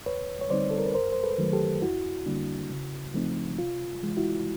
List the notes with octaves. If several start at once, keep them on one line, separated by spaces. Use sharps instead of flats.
D#2 B4 C#5
C#5
D3 G3 C4 D#4 C5 D5
A4
A#4
B4
F#2 A#4 C5
C5
A4 B4
D#3 F#3 A3
G4 A4
F2 E4 F#4
D3 G3 A#3 D4
C#3
F3 A3 C4 D#4
C3 F4
E3 G#3
E4 F#4